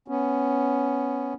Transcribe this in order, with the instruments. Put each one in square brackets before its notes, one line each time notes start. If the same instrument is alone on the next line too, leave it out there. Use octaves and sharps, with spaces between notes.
[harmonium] B3 C#4